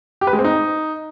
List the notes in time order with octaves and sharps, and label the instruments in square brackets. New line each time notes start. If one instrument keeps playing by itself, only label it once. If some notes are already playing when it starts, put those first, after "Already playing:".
[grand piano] G4
B4
G#3
C4
D#4